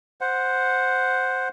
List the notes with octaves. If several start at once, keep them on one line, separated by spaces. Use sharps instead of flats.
C5 F#5